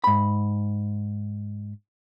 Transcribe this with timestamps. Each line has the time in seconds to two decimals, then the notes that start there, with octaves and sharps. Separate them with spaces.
0.04 G#2 B5